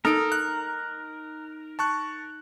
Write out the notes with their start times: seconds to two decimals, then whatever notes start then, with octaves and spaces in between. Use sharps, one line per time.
0.05 D#4 A4 A#4 D7
0.32 F#6
1.79 A5 C#6 F#6